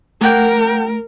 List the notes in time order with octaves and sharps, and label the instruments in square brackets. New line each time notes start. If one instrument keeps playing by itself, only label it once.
[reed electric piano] A3 [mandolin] A#3 F#5 G5 [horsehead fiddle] A#4